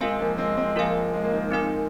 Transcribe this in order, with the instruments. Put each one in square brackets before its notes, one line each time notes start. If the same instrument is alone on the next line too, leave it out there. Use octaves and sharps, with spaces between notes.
[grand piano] G#3 C4 [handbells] F4 A#4 F5 G#5
[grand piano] F3 A#3
G#3 C4
G#3 C4
[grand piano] F3 A#3 [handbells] F4 A#4 F5 G#5
[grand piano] G#3
A#3
D#3 G#3
[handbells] C4 D#4 A#4 G#5